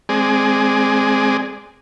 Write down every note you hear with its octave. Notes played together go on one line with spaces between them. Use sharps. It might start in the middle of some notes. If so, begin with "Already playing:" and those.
G#3 C4 G#4 D5